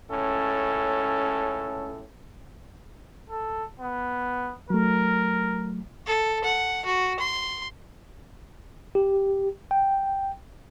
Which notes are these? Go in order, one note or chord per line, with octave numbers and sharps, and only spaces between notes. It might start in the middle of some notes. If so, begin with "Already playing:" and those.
C#2 A2 C#4 A4
A4
B3
F#3 A3 A#4
A4
F#5
F#4
C6
G4
G5